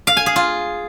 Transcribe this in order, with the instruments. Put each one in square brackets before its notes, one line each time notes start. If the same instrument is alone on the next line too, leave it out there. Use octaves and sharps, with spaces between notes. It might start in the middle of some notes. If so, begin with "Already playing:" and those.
[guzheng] F5
G#5
G#4
F4